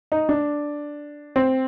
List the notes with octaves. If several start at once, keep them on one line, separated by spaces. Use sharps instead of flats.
D#4
D4
C4